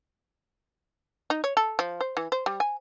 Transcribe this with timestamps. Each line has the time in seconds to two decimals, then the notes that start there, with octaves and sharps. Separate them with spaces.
1.30 D#4
1.44 C#5
1.57 A4
1.79 F3
2.01 C5
2.17 E3
2.32 C5
2.46 G3
2.60 G#5